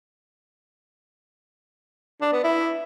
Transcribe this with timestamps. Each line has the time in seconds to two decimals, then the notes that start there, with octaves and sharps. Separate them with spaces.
2.21 D4
2.33 B3
2.44 E4